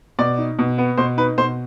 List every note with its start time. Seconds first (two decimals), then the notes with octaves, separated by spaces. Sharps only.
0.19 B2 D5
0.38 D#4
0.59 B2
0.78 B3
0.98 B2 C5
1.17 D#4 B4
1.38 B2 C5